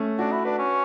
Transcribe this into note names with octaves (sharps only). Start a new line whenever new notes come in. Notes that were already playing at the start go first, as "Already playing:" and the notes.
Already playing: A3 C#4
D4 F#4
E4
D4 B4
C#4